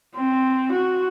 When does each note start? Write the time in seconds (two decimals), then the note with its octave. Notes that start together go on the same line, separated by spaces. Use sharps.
0.16 C4
0.72 F#4